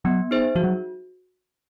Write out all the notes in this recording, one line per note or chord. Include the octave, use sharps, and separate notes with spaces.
F#3 B3
D#4 G#4 C5 E5
F3 F#4
F#3